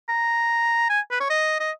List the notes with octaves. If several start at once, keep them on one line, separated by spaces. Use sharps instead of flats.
A#5
G#5
B4
C#5
D#5
D#5